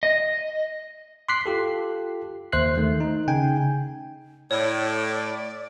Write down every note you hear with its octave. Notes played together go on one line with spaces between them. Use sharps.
D#5
C6 D6 F#6 B6 C7
F4 G4 A4
D#2 C5 E5 F#6 C7
D#3 A3
D#4
C#3 D#4 G5 G#5
A2 C#5 D5